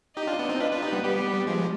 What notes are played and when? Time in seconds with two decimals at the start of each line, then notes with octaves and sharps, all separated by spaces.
0.17 D#4 G4 D#5
0.27 D4 F4
0.39 B3 D4
0.49 C4 D#4
0.60 D4 F4 B4
0.71 D4 F4
0.82 D#4 G4
0.92 G3 B3
1.04 G3 B3 G4
1.47 F3 G#3